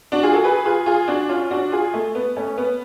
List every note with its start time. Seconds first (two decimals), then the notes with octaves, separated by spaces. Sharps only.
0.12 D4 F#4
0.23 F4 G#4
0.33 F#4 A4
0.44 G#4 B4
0.65 F4 G#4
0.86 F4 G#4
1.08 D4 F#4
1.29 C#4 F4
1.50 D4 F#4
1.72 F4 G#4
1.94 A3
2.15 B3
2.37 A3 C#4
2.58 B3